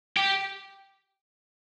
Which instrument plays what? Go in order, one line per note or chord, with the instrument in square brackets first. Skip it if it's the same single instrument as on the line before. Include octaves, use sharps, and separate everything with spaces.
[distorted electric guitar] G4